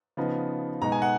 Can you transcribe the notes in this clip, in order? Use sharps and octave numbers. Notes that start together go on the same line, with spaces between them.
C#3 F3 B3 D#4
B2 G#3 D#4 A#5
G#5
F#5